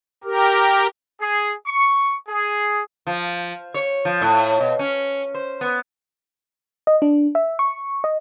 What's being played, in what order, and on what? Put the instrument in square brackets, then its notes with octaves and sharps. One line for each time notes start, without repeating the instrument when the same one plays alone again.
[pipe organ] G4 A#4
[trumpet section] G#4
C#6
G#4
[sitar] F3
C#5
F3
A2
B2
C#4
C5
B3
[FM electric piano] D#5
D4
E5
C#6
D#5